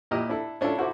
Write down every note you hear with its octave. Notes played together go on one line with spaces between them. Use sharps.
A#2 E4 G4 D#5 F6
D4 E4 A4
C#4 D4 E4 F4 A4
E4 F#4 A4 C5 E5 D6